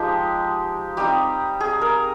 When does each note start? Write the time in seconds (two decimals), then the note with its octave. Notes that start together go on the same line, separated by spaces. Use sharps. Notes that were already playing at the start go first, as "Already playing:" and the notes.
Already playing: F3 G#3 D#4 G4
0.97 G3 C4 D#4 G4
1.60 G#4
1.81 A#4